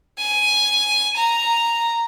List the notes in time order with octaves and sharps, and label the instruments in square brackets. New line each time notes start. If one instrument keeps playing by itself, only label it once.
[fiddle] G#5
A#5